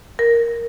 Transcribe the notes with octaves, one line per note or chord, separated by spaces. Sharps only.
A#4